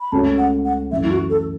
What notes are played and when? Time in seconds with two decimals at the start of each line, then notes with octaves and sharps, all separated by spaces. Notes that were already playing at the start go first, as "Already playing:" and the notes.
0.01 B5
0.12 C#2 C#3 A3 F#4 C#5 A5
0.38 F#5
0.65 F#5
0.91 F#2 E3 A3 E5
1.03 E4
1.11 F#4
1.30 A4